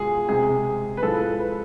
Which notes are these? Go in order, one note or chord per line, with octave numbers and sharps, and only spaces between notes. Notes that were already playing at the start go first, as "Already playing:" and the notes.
Already playing: B2 G#3 F4 G#4
C3 G#3 G#4
B4
A2 F3 G#3 A4
B4